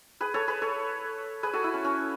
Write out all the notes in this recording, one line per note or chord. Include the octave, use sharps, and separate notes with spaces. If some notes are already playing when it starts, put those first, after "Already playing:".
G#4 B4
A4 C#5
G#4 B4
A4 C#5
G#4 B4
F#4 A4
E4
C#4
C#4